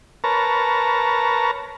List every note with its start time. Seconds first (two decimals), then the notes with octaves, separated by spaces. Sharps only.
0.24 A#4 B4 C#5 A5 A#5